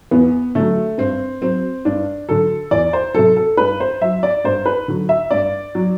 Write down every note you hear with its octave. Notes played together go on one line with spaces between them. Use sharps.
E2 B3
D3 F#3 A3
G2 C4
F#3 C4
G2 D4
D3 F#3 A4
E2 D5
C5
C3 F#3 A4
A4
G2 B4
C5
F#3 E5
D5
G2 C5
B4
D3 F#3
E5
G2 D5
F#3